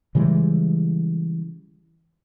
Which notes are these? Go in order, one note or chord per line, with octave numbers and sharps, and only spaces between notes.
C#3 E3 G3 G#3